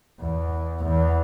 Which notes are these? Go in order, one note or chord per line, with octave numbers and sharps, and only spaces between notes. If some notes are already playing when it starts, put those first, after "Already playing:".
E2
E2